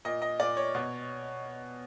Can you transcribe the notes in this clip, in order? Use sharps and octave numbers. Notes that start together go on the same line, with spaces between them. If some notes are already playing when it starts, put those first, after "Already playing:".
A#2 D#5
D#5
A#2 D5
C#5
B2